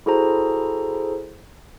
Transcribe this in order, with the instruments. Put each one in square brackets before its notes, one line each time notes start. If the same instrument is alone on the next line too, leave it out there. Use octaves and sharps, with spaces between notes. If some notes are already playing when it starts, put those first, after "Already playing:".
[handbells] E4 F#4 G#4 A4 C5 A#5